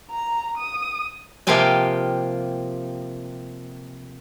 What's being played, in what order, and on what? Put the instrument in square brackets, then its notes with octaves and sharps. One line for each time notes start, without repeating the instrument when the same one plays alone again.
[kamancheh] A#5
D#6
[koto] C3 F3 A#3 F4 G4 G#5